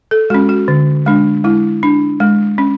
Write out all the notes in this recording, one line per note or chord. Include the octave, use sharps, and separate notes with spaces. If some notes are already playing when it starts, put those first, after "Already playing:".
A4
G#3 C#4 F#4
F#4
D3
G#3 D4
G#3 E4
D4
G#3
C#4